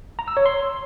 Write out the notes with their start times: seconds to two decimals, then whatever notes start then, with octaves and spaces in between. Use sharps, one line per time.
0.19 A#5
0.28 E6
0.37 C#5
0.46 C6